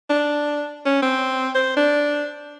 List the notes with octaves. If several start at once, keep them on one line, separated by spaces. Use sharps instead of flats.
D4
C#4
C4
C5
D4